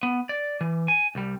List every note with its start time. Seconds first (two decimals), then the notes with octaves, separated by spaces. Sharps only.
0.03 B3
0.29 D5
0.61 E3
0.88 G#5
1.15 C2 G3